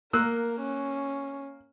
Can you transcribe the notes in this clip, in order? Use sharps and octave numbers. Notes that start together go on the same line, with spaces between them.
A#3 A#4 E6 F#6
C#4